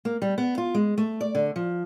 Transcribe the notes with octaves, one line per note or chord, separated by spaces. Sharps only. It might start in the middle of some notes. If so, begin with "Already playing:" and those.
A#3
G3
B3
F4
G#3
A3
D5
D3
F3